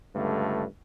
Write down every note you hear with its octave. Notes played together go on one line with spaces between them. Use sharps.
C#2 G2 D3 A3